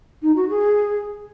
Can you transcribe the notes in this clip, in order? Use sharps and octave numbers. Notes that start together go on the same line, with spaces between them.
D#4
F#4
G#4